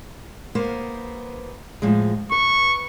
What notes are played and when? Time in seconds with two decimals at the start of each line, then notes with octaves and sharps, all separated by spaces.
0.55 A#3 B3 C5
1.82 A2 F3 G#3
2.32 B4 C#6